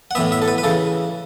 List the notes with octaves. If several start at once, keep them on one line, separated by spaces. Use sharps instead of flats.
F#5
A2 E3 B3 E5
E5
A4
B4
B4
C#3 E3 A4